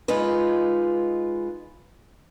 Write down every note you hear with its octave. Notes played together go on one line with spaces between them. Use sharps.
G#3 D#4 F4 B4